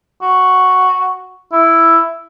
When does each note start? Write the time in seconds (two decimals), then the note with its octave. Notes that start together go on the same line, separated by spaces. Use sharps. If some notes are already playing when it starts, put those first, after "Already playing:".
0.22 F#4
1.52 E4